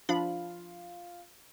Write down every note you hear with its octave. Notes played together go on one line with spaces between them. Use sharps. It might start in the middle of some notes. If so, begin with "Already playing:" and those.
F3 D4 F4 B5